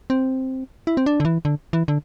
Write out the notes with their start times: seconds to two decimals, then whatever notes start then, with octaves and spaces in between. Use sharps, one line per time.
0.10 C4
0.87 E4
0.97 C4
1.06 D4
1.20 D3
1.25 E3
1.45 D3
1.73 E3
1.88 D3